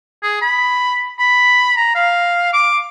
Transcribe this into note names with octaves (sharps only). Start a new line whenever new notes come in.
G#4
B5
B5
A#5
F5
D6